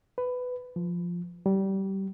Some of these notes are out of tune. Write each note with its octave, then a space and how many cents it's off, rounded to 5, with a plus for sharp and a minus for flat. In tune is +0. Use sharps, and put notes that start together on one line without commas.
B4 +15
F3 +0
G3 -20